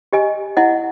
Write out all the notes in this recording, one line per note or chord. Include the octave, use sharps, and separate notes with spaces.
G4 D#5 G#5
E4 D#5 F#5